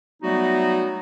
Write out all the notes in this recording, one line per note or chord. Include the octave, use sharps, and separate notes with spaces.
F#3 G3 A3 B3 D#4 F#4